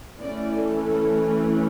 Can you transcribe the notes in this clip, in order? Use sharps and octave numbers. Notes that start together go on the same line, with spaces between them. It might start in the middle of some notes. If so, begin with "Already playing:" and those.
E3 A3 C#4 D5
A4